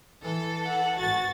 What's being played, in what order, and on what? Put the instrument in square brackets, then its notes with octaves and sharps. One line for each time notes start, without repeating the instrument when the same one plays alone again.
[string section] E3 A4
[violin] F#5
[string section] G#1 A6 [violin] F#4